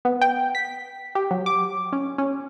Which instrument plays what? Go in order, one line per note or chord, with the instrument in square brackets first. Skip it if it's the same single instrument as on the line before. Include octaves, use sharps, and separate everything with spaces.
[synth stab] B3
G5
B6
G4
F#3
D6
C#4
C#4